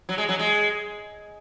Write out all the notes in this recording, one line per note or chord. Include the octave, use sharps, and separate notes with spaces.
F#3
G#3
F#3
G#3